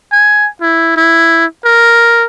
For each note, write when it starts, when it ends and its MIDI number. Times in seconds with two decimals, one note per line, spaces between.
0.12 0.48 80
0.62 0.94 64
0.96 1.45 64
1.65 2.26 70